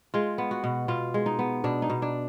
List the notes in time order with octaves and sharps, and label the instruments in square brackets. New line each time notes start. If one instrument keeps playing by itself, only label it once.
[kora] G#3 F4
B3
F#4
B2
B2 F4
G#3
D#4
B3
B2 D4
D#4
B2
D4